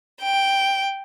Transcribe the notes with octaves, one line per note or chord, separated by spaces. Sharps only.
G5